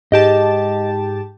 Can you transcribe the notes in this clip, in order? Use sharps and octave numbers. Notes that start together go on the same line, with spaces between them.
G#2 G4 D#5 A5